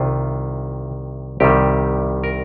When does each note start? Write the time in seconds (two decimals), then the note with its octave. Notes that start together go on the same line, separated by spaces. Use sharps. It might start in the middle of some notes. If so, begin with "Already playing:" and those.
Already playing: C2 C3 D#3 F4
1.40 C2 C3 D#3 G3 G4
2.24 A#4